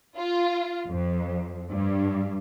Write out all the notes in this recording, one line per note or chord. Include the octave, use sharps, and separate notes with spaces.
F4
F2
G2